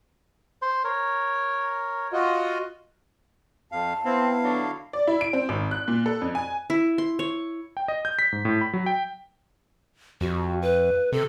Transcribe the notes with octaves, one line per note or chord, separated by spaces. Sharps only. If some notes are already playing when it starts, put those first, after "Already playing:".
C5 C6
A#4 C#5
F4 F#4 D#5
F2 F5 A5
B3 C4 E4 F5
D3 F#3 D4
D5
E4
D7
C4
G#1
F#6
A#2
A4
F2
G#5
E4
C6
C#5
G5
D#5
G6
B6
G#2
A2
B5
F#3
G5
F2 F#4
B4
C3 A4